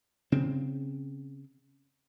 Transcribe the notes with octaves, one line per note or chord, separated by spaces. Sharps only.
C#3 C4